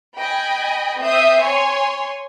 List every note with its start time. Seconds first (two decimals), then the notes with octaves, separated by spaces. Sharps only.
0.18 D#5 G5 G#5 B5
0.99 C4 E5 D#6 G6 C7
1.43 C#5 G#5 C6